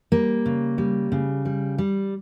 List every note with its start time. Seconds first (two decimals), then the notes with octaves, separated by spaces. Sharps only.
0.12 G3 A#3
0.46 C#3
0.78 G3
1.12 C#3
1.45 G3
1.78 G3